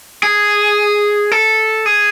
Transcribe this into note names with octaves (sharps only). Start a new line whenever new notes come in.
G#4
A4
G#4